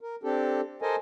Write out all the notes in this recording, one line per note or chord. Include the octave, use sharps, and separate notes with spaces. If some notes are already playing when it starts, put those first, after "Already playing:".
A#4
C4 D4 G4 A4
A4 A#4 C5 D#5 G#5